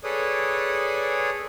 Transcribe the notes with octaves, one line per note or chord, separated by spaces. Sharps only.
G#4 A4 B4 C#5 D5 D#6